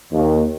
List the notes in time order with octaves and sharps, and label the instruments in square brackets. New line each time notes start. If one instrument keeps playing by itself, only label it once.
[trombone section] D#2